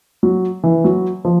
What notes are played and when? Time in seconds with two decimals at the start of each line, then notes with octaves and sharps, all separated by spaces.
0.23 F#3
0.64 E3
0.84 F#3
1.25 F3